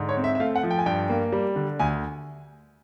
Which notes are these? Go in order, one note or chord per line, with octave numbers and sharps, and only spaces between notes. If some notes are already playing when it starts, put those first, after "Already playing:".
Already playing: G#2 D3
C#5
C4
E5
E5
A3 F5
F#5
F3
G5
G#5
G2 G5
A#3
G3
D3
D2 G#5